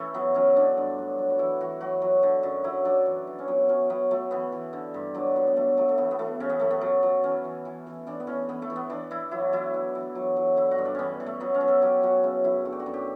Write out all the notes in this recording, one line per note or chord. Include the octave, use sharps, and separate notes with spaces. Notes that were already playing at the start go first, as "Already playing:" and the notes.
Already playing: E3 A3 C#4 E4
F#3 B3
F#3 C#4
D3 D4
G2
F#3
F#3
F#4
E3 E4
E3 F#4
F#3 F#4
F#3
D3
F#2
F#3 E4
F#3 D4
E3
E3
C#4
F#3 B3
F#3 C#4
F#3 B3
F#3 A3
E3 B3
E3
D3
G2
F#3 D4
F#3 B3
B3
F#3 A3
F#3 A3
A3
E3 B3
B3
E3 A3
C#3 C#4
B3
F#2 A3
B3
F#3
F#3
E3 C#4
E3
E3
E3
E3 D4
B3
E3 C#4
E3 B3
A3
E3
B3
E3 D4
E3 E4
F#3 E4
F#3 E4
E3
E3
F#3
F#3
D3 E4
F#4
G2
D4
E3 B3 C#4
E3
A3
F#3 B3
C#4
F#3
A4
F#3 G4
F#3 F#4
C#3 E4
F#2 E4
D3 F#4
G4
F#4
F#2
G4